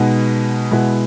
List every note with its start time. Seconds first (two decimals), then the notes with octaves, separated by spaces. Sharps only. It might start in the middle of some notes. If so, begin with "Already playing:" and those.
Already playing: B2 G#3 B3 D#4
0.71 B2 G#3 B3 E4